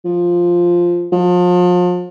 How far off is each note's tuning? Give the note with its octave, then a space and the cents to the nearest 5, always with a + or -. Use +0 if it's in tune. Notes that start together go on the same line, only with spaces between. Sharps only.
F3 +0
F3 +35